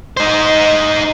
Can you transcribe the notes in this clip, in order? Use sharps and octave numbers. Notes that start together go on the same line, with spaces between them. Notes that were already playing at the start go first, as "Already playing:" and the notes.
D#4 C5